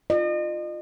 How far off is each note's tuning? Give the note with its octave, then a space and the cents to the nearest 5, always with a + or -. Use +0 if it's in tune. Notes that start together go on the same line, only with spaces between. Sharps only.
F4 +0 D#5 -40